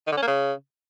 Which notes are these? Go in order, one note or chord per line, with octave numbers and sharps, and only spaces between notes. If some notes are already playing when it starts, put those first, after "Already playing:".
D#3
D3
C#4
A#3
C#3